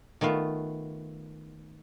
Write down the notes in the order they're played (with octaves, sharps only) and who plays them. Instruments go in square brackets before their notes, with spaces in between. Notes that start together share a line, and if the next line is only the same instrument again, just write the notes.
[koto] D#3 A3 B3 F4